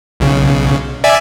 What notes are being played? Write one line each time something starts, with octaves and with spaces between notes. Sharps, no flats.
B1 C#3
D5 E5 G#5